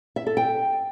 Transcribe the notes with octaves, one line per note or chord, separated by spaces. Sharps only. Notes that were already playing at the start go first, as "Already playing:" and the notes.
E5
A4
G5